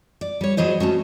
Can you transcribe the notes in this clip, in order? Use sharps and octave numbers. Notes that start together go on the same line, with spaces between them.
D5
G3 C#5
F#3 B3 G#4 C5 D#5
A3 B3 C#4 F#4